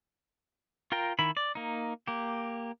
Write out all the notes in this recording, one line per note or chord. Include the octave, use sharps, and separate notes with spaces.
F4 A#4 G5 A#5
D#3 E4 B5
D5
A#3 D#4
A#3 G4